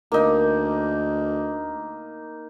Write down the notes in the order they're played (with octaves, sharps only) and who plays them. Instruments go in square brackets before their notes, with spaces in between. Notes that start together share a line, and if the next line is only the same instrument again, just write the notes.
[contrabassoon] D2 [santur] A#3 D#4